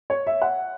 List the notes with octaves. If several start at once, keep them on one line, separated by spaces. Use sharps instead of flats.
C#5
E5
F#5